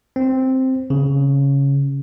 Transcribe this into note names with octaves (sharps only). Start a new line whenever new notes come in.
C4
C#3